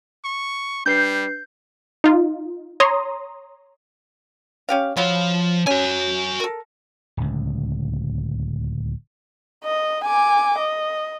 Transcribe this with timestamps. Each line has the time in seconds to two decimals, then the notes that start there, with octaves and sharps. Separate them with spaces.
0.25 C#6
0.86 G3 D4 B4 G6 C7
2.04 D#4 F4
2.80 C#5 A#5 C6 D#6
4.69 C#4 G4 F5
4.96 F3 F#3 F4 B5 C6
5.67 C#4 F#4 G#5
6.40 A4 A#4
7.17 D1 C#2
9.64 D#5
10.04 G#5 D6
10.59 D#5